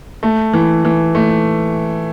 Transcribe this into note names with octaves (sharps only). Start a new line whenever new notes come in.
A3
E3
E3
A3